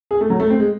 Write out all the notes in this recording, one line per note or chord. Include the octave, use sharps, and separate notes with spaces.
G#4
A3
F#3
A3
C4
G#3